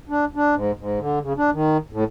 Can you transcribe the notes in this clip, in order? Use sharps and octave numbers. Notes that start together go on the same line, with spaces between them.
D4
D4
G#2
G#2
D3
C#3
D4
D#3
A2